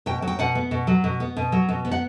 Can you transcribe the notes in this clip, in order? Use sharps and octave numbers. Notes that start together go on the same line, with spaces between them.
B2 G5
F#3
G5
B2 F#5
B3
B2
F#3
B2
B3
B2
F#3
B2
B3
F#5